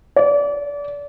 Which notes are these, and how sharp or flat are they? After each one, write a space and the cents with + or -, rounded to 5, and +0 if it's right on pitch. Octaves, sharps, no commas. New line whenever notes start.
D5 -30